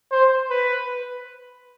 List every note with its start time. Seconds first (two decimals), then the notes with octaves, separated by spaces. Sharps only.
0.12 C5
0.50 B4